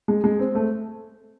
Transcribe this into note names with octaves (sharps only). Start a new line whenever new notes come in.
G#3
G#3
C4
A3